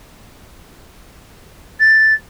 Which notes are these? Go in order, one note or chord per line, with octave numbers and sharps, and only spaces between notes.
A6